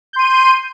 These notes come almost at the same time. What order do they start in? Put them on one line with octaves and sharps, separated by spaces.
G6 C6 D#7